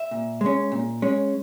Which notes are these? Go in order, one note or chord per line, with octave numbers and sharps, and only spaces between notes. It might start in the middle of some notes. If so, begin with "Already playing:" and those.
Already playing: E5
A#2
G#3 C#4
A#2
G#3 C#4